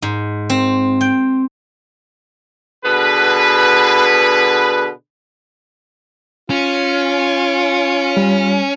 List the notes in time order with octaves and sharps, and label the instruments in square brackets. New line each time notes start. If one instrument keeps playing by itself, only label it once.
[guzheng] G#2
C4
G5
[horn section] B2 D3 G#4 B4
[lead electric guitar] C#4 [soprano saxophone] F4
[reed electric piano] G3